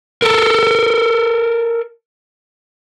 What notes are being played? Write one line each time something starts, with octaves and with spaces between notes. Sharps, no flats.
A4 A#4